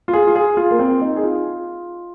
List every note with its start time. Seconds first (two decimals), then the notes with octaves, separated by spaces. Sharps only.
0.08 F4
0.13 G#4
0.27 F4
0.35 G#4
0.57 F4
0.71 A#3
0.79 C4
1.02 D#4
1.16 G#4
1.24 F4